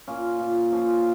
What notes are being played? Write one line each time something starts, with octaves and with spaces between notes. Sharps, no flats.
A#2 C#4 F4
A#2
F3 C#4 F4